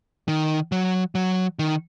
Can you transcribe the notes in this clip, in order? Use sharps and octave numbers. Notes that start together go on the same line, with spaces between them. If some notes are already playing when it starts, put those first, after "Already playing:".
D#3
F#3
F#3
D#3